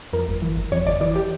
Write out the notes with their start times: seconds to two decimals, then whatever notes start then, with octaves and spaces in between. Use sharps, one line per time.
0.13 F2 A#4
0.28 G1
0.42 E3
0.57 G1
0.72 F2 C#5
0.86 G1 D5
1.01 E3 D5
1.16 G4